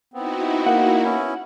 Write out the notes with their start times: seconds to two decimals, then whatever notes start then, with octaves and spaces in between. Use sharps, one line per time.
0.14 B3 C4 D#4 E4 F#4
0.66 A#3 F#5
1.03 B3 C#4 E4